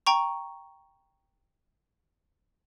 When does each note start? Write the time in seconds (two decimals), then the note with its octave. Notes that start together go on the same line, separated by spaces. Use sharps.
0.07 G5 A#5 C#6